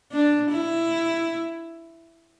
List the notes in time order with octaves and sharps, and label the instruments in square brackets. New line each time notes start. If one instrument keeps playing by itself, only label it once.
[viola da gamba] D4
E4